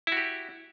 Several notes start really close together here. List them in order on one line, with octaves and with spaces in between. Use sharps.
E4 F#4 G4